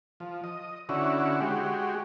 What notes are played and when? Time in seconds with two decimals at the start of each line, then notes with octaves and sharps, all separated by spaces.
0.20 F3
0.44 D#5
0.89 D3 C#4 E4 F#4
1.40 G#3 F#4 G4